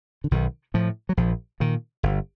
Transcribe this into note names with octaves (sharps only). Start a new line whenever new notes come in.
D3
B1 D#3
A2 F3
F#3
A#1 F3
A#2 D#3
G1